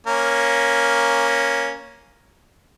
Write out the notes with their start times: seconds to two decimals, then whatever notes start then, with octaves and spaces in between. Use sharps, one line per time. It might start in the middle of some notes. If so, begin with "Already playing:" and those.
0.07 A#3 C#4